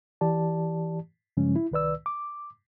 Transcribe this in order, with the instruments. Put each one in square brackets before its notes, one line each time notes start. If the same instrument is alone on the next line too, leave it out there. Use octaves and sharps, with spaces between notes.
[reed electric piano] E3 G4 D5 A5
G2 C#3 F3 G#3 C#4
E4
C2 D#3 B4 D5 E6
D6